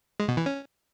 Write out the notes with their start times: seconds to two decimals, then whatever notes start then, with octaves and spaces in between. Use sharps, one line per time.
0.20 G#3
0.28 B2
0.37 E3
0.46 C#4